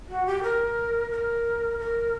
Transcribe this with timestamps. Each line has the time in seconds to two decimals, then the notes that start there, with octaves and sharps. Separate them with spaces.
0.09 F#4
0.26 G4
0.43 A#4
1.11 A#4
1.79 A#4